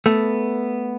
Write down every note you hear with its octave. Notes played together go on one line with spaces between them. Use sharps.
A3 B3